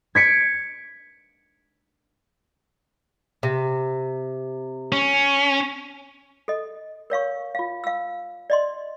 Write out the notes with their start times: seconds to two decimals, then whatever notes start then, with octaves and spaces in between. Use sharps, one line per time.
0.15 G#6 B6 C#7 D7
3.43 C3
4.92 C#4
6.48 A4 D#5
7.10 A#4 C#5 F5 C#6
7.55 F4 F5
7.84 F5 E6
8.50 D5 D#5 C6